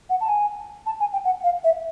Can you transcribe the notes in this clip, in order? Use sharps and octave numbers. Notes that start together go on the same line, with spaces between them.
F#5
A5
G#5
A5
G#5
G5
F#5
F5
E5